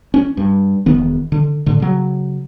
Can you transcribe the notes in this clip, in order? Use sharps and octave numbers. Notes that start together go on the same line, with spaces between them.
C#4
G2
E1 D#3 B3
D3
A2 D3
C#3 F#3